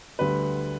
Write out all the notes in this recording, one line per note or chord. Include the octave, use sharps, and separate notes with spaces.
D2 D3 G3 B4